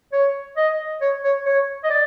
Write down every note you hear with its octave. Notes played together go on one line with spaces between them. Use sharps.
C#5
D#5
C#5
C#5
C#5
D#5
D5